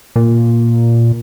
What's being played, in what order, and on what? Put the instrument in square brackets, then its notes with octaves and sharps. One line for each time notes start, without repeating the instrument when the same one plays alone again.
[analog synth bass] A#2